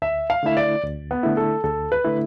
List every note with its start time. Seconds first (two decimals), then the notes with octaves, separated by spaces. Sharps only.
0.02 D2 E5
0.30 F5
0.43 D3 A3 E4 E5
0.57 D5
0.84 D2
1.11 B3
1.23 D3 A3 E4
1.37 A4
1.64 D2 A4
1.92 B4
2.04 D3 A3 E4